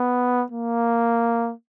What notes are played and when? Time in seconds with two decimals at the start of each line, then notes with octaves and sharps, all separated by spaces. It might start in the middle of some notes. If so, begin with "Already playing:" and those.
Already playing: B3
0.52 A#3